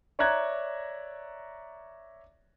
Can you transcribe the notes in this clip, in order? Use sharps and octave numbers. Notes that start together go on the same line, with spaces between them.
C#5 D5 E5 A#5 F#6 G#6